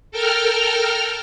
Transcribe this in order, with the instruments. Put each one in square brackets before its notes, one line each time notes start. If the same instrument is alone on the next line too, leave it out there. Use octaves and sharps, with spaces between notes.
[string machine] A4 A#4 G5 F6